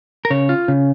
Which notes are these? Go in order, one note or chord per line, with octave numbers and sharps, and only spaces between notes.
A#4
C#3 C#5
F4
C#3